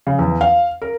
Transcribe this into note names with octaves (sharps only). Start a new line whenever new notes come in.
C#3
E2
F5
A#4